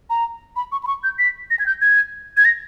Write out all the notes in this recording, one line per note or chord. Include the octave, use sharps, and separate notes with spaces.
A#5
B5
C#6
B5
C#6
G6
B6
A#6
G#6
G6
G#6
G#6
A#6